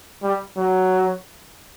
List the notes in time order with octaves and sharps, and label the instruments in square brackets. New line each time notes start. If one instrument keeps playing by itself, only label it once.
[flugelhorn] G3
F#3